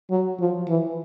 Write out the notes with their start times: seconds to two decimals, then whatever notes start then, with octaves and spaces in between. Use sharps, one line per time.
0.11 F#3
0.40 F3
0.68 E3